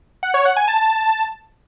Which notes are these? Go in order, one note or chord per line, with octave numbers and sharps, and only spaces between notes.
F#5
C#5
F#5
G#5
A5